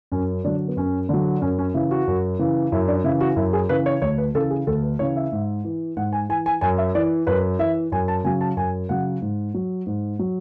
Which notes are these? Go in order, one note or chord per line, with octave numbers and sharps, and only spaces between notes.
F#2 C#4
D3 F#3 D4
B3
F#2 C#4
D3 F#3
F#2 C#4
C#4
C#3 E3 E4
F#4
F#2
C#3 E3
F#2 E4
D4
C#3 E3 E4
F#4
F#2 E4
G#4
C#3 E3 B4
C#5
D2 C#5
B4
C#3 E3 A4
G#4
D2 A4
B4
C#3 E3 C#5
E5
G#2
E3
G#2 F#5
G#5
E3 G#5
G#5
F#2 G#5
E5
E3 D5
F#2 B4
E3 E5
F#2 G#5
A5
C#3 F#3 G#5
A5
F#2 G#5
C#3 F#3 F#5
G#2
F#3
G#2
F#3